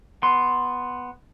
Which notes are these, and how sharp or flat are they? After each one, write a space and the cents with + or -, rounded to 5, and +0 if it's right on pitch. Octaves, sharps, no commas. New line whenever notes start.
B3 +0 C6 +0